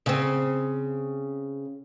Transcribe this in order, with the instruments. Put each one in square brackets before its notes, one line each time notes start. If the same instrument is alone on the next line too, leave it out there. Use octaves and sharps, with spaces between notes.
[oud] C#3 C4